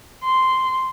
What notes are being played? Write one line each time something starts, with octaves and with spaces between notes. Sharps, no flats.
C6